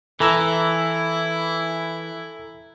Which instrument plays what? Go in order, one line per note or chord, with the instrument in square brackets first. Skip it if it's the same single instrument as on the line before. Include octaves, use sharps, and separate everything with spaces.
[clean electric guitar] E3 [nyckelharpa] E4 [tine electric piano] A4 A#5 E6